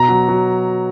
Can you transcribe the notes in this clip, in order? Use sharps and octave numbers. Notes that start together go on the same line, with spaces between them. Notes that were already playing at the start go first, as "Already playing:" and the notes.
Already playing: B2 A#5
F#3
F#3